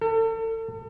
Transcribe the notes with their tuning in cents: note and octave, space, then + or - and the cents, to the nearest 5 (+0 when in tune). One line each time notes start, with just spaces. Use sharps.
A4 +35